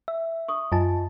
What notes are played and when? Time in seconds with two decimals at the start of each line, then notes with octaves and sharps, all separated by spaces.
0.08 E5
0.48 C#6 D#6
0.72 F#2 F4 D#5 G#5 A5